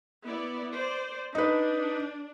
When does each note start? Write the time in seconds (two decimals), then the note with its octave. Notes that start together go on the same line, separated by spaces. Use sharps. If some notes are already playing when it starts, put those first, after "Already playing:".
0.24 B3 E4 D5
0.73 C5 D5
1.35 D4 D#4 B4